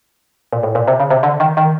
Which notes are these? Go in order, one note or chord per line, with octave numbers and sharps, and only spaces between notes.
A#2
A2
A#2
C3
C#3
C3
D3
D#3
D#3